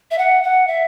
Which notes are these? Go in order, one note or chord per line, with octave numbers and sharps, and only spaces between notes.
E5
F#5
F#5
E5